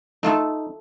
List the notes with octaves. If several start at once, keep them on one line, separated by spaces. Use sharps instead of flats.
A3 D#4 F4 A4